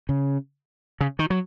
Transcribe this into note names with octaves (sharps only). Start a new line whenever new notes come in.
C#3
C#3
D#3
F#3